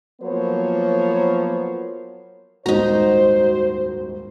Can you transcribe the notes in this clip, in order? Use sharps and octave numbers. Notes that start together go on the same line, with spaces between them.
F3 F#3 A#3 B3 C5 C#5
D#1 C#2 G#2 D#4 F#4 C5 A#5